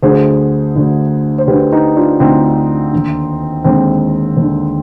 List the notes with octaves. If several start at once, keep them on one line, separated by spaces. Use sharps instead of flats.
D2 D3 G#4 C5
D2 D3
C5
D2 D3 G4 B4
D#4 G4
D4 F4
D2 D3 C4 D#4
D#2 D3
D#2 D3 G#3 C4
D#2 D3